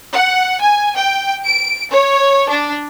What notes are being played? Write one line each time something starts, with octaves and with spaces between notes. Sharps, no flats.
F#5
G#5
G5
D7
C#5
D4